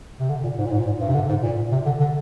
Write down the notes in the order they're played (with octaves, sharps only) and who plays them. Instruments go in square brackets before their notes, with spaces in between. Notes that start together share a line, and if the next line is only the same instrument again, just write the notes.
[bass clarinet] C3
D3
A#2
G#2
A#2
G#2
A#2
G#2
G2
C3
D3
G#2
A#2
C3
D3
D3